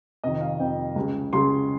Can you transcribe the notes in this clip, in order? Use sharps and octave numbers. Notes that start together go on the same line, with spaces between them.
F2 C3 D#3 D#5
F5
F2 C3 D#3 G5
C#2 C#3 G#3
C#2 C#3 G#3 C6